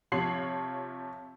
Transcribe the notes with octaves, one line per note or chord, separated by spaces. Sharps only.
C3 F3 C#5 C7 F#7